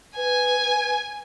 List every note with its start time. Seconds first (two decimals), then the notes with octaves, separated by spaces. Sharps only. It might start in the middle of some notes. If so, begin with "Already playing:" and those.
0.17 B4 G#5